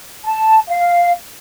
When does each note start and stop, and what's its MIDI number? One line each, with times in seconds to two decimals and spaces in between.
0.24 0.60 81
0.68 1.12 77